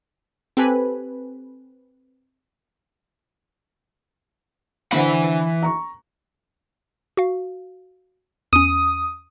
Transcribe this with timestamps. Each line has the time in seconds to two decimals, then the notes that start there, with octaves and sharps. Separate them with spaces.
0.57 C4 G4 A4 B4 G#5 B5
4.92 D3 E3 C5 F#5 B5
5.62 A#5 C#6
7.17 F#4 F5
8.53 E2 C#4 D#6